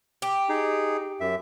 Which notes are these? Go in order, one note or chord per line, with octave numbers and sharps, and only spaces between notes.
G4
D#4 G#4
F#2 E5